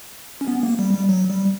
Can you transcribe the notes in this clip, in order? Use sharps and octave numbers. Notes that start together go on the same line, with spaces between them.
C#4
B3
B3
A#3
G3
G3
F#3
G3